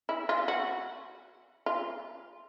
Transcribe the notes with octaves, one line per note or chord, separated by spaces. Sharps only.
E4
F4
F#4
F4